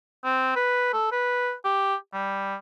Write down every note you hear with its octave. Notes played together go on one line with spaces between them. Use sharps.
C4
B4
A4
B4
G4
G3